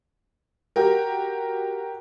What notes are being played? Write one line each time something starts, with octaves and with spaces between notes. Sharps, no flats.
F#4 G4 A#4